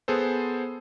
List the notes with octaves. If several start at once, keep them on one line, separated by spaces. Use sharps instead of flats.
B3 G#4 A4 C5